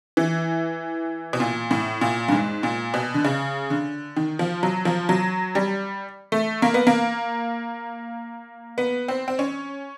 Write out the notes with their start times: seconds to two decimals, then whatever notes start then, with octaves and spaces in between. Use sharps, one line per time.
0.17 E3
1.33 B2
1.40 A#2
1.71 A2
2.01 A#2
2.28 G2
2.32 G#2
2.63 A#2
2.94 B2
3.14 D3
3.25 C#3
3.70 D3
4.16 D#3
4.39 F3
4.63 F#3
4.85 F3
5.09 F#3
5.55 G3
6.32 A3
6.62 A#3
6.74 B3
6.87 A#3
8.78 B3
9.08 C4
9.28 C4
9.39 C#4